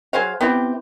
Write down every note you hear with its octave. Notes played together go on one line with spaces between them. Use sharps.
F#3 G#4 C5 F5
B3 C4 E4 G4